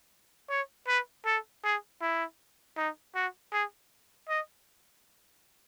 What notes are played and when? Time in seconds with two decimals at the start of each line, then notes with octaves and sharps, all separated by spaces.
0.50 C#5
0.87 B4
1.26 A4
1.64 G#4
2.01 E4
2.77 D#4
3.15 F#4
3.52 G#4
4.29 D#5